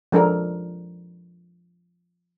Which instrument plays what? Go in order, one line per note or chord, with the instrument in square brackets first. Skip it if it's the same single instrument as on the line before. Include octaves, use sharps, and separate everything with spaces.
[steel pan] F3 G#3 D4 A4 A#4